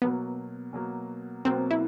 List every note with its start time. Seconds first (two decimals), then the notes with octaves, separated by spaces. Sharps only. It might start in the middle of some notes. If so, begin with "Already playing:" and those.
0.02 B2 F#3 A#3 B3
0.73 B2 F#3 A#3
1.45 B2 F#3 A#3 C4
1.71 E4